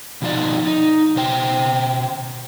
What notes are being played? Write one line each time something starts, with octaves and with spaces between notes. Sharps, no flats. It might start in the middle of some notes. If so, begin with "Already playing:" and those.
B2 F3 D#4 F4 D5
D#4
B2 C5 G5